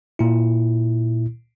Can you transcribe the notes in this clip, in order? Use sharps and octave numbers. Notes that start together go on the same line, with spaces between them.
A#2 E4